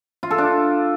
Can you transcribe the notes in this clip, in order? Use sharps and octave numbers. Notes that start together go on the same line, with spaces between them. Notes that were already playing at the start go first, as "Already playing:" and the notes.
F4
A4
D4